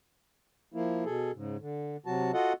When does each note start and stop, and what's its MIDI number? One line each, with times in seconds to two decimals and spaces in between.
0.74 1.04 53
0.74 1.04 58
0.74 1.04 64
1.05 1.31 47
1.05 1.31 68
1.05 1.31 69
1.35 1.57 44
1.35 1.57 49
1.60 1.97 50
2.06 2.31 48
2.06 2.31 54
2.06 2.31 66
2.06 2.31 81
2.34 2.53 65
2.34 2.53 66
2.34 2.53 69
2.34 2.53 75
2.34 2.53 78